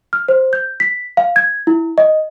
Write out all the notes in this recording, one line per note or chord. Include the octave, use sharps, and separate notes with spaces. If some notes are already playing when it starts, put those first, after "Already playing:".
F6
C5
G6
B6
F5
G#6
E4
D#5